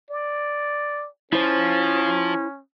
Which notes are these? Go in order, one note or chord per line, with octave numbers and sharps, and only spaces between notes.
D5
F3 C#4 E4 C5